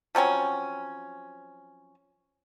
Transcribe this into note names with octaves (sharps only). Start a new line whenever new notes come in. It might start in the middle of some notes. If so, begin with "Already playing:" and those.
F3 F#3 C4 C#4